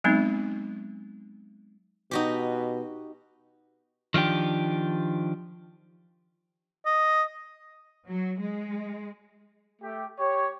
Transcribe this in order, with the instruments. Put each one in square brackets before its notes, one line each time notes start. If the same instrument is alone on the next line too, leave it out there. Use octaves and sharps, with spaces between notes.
[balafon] F#3 G#3 B3 C4 D#4
[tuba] B2 [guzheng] D#4 F#4 G4
[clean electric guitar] D#3 F3 D4 G4
[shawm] D#5
[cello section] F#3
G#3
[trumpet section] A3 G4
G4 C#5